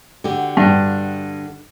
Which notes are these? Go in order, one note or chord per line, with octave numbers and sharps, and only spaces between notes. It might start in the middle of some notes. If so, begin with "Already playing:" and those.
D3 F#4 G4
G2